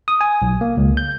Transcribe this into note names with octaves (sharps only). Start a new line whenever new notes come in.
D#6
G#5
B1
A#3
C#2
G6